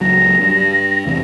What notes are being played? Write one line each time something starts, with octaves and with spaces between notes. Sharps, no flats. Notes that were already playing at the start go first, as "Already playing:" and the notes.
C#2 F#3 A#6
G2
E2 C3